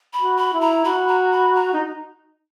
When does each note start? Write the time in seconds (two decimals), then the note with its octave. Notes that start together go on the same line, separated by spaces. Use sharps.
0.13 B5
0.21 F#4
0.37 B5
0.53 E4
0.61 A#5
0.85 F#4 B5
1.08 A#5
1.32 B5
1.56 A#5
1.74 D#4